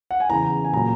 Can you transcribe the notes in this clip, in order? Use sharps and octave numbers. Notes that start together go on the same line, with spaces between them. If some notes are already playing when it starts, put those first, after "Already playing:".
F#5
G#5
E2 C#3 E3 A#5
G#5
A#2 F#3 A#5